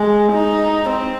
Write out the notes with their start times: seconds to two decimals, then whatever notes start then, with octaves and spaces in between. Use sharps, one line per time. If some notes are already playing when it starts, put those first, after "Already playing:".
Already playing: G#3
0.32 D#4
0.89 C4